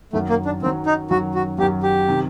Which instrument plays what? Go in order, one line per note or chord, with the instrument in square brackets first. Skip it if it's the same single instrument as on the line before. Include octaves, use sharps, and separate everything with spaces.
[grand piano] F#2 D#3 F#3 [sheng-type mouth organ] A3
[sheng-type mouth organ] A#3
D4
[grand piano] F#2 D#3 F#3 [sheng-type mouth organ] C4
[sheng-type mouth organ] D#4
[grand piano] F#2 D#3 F#3 [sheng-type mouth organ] F#4
[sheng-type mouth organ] F#4
[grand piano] F#2 D#3 F#3 [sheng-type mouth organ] G4
[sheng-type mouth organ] G4
[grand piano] C3 D#3